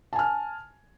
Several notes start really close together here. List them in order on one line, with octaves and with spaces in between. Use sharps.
A5 G#5 F6